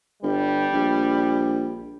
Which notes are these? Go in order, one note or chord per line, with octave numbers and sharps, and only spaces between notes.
G1 G3
A#1